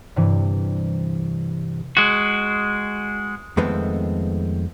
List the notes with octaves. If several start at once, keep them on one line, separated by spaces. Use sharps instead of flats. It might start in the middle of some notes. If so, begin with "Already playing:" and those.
G2 C3 E3
G#3 F#4
F2 D#3 G#3 A3 B3 C4